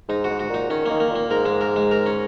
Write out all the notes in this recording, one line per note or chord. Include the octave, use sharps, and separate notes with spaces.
G#2 D#4
F#4
G#2
F#4
A#2 D#4
D#3 C#4
A#3
D#3
A#3
A#2 A#3
G#2 A#4
G#3
A#4
G#3
A#4
C#4